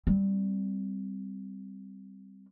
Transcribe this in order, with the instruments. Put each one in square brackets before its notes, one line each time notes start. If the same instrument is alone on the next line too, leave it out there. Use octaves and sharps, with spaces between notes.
[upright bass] G3 C4